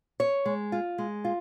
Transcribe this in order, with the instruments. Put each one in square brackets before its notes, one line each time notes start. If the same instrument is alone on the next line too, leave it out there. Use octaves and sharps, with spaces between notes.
[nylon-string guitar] C#5
G#3
F4
G#3
F4